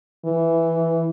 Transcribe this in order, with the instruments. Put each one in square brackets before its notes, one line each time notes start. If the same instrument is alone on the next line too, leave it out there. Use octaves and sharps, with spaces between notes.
[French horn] E3